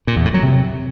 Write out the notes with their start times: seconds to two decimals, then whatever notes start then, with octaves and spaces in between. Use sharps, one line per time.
0.07 A#2
0.16 E2
0.25 A2
0.34 F#3
0.43 C3